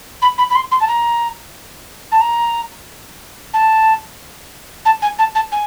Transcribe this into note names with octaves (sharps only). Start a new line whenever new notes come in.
B5
B5
B5
C6
C6
A5
A#5
A5
A#5
A5
A5
G#5
A5
A5
G#5